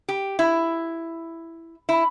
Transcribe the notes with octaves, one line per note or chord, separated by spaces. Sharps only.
G4
E4
E4